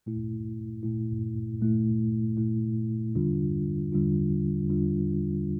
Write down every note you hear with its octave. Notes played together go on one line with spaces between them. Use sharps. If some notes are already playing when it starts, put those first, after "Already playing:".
A#2 A3 E4
A#2 A3 E4
A#2 A3 E4
A#2 A3 E4
E2 D3 G3 D4 F4
E2 D3 G3 D4 F4
E2 D3 G3 D4 F4